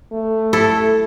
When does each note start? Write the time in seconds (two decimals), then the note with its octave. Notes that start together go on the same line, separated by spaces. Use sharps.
0.12 A3
0.53 E4 A4